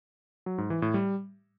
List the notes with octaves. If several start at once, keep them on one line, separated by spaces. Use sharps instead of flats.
F#3
G#2
E3
A2
G3